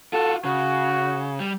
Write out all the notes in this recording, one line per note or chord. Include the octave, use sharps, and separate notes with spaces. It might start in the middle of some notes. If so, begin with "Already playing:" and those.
F4 F#4 A4
C#3 F#4
G3